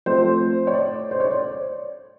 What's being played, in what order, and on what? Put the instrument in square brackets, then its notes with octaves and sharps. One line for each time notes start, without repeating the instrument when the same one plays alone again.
[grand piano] F3 A3 C4 C5
C#5
D5
C5
C#5
D5